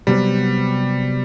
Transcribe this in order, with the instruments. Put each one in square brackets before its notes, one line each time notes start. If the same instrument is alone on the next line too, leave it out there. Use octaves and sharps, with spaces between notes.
[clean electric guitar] C3 F#3 B3 F#4 C5 [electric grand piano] G3